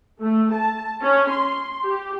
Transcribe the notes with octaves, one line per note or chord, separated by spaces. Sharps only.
A3
A5
C#4
C6
G4